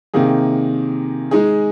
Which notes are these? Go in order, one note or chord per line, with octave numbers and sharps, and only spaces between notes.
C3 D#3 A#3 D#4 G#4
G#3 D#4 G#4